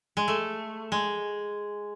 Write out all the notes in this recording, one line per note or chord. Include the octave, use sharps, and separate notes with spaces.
G#3
A3
G#3